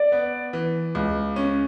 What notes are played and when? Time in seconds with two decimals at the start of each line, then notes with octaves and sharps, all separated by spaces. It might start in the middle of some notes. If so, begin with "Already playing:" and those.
Already playing: D5
0.12 B3
0.53 E3
0.95 C#2
1.36 C#4